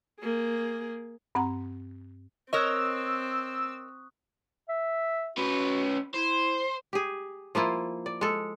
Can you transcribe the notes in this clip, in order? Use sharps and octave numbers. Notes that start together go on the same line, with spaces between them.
A#3 G#4
G2 C4 F#5 A#5
C4 A#4 C#5 D#5 C#6 D#6 E6 F#6
E5
C#4 F#4 B4
E4 C5
G4 G#4
F3 A#3 E4 F4
D5
G#3 A4